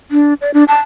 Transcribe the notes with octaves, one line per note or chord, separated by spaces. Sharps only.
D4
D5
D4
A5